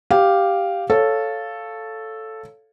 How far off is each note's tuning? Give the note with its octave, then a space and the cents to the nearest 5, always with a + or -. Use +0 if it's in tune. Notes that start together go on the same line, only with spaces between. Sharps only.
G4 +0 F5 +0
A4 +0 C#5 +0 F5 +0